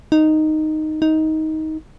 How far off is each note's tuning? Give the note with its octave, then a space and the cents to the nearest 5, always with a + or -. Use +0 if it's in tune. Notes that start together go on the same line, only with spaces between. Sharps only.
D#4 -5
D#4 +15